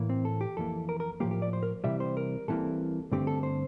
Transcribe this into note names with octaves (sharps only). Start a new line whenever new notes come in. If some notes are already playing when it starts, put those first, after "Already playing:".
Already playing: A2 E3 A#3
C4
A4
G4
F2 E3 A#3 A4
A#4
A#4
A2 F3 A#3 G4
G4
D5
C5
A#4
C2 C3 E3 G3 C4 E5
C5
A#4
C2 C3 E3 A#3 A4
G2 D3 A3 C4 G4
A4
C5